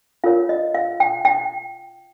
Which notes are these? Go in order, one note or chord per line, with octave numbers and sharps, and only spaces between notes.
F4 A#4 C#5 F5
D#5
F5
G5
G5